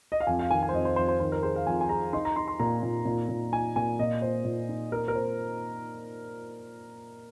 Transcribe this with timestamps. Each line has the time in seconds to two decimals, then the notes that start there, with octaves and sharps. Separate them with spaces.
0.12 D#5
0.20 F5
0.27 F2 G#5
0.39 F5
0.51 D#3 G#5
0.63 G#5
0.69 C5
0.73 F2 D#5
0.85 C5
0.96 F2 C5
1.08 C5
1.20 D#3 C5
1.32 A#4
1.43 G#4 C5
1.55 F5
1.67 F2 G#5
1.81 G#5
1.89 G#4 A#5
2.13 D#4 C6
2.25 A#5
2.36 D#4 C6
2.48 C6
2.59 A#2 A#5
2.83 A#2
3.05 A#2
3.29 A#2
3.52 D#4 G#5
3.76 A#2 G#5
3.99 A#2 D#5
4.22 C5
4.45 A#2
4.69 D#4
4.91 D#4 A#4
5.08 A#4
5.15 C5